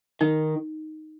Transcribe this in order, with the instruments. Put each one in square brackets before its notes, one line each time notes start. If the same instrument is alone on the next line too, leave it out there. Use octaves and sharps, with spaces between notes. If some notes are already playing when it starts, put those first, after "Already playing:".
[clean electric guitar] D#3 [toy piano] D#4